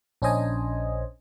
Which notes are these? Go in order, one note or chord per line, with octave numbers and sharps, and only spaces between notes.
A#1 C#4 D4 C5 D#5 G#5